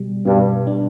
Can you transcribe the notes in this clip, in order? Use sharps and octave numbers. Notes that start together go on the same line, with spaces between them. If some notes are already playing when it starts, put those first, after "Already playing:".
Already playing: B2 G3
G2 B2
D4